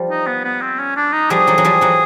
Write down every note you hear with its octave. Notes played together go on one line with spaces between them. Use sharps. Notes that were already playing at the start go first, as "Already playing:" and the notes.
Already playing: F3 G3
D#4
B3
B3
C4
C#4
D4
D#4
F3 G3 G#4
E3 F#3
F#3
F3 G3
E3 F#3